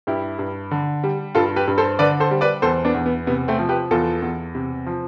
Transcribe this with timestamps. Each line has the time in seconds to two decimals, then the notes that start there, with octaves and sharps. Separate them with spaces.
0.07 G2 E4 G4
0.39 G2
0.71 D3
1.04 G3
1.35 G2 F4 A4
1.56 G4 B4
1.68 G2
1.78 A4 C5
1.99 D3 B4 D5
2.20 A4 C5
2.31 G3
2.41 B4 D5
2.62 E2 A4 C5
2.84 B3 D4
2.94 E2
3.06 B3
3.27 C3 B3
3.48 A3 C4
3.59 F3
3.69 G4 B4
3.91 E2 F4 A4
4.22 E2
4.55 C3
4.86 F3